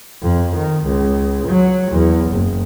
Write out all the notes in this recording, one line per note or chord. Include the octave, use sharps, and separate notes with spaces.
F2
D#3
C#2
F#3
E2
F#1